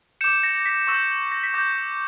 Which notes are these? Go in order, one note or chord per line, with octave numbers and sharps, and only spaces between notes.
D6 G6 C#7 E7
A#6 C#7
A#6
B6
C#6 E6 G6 A#6
A#6
B6
D6 G6 A#6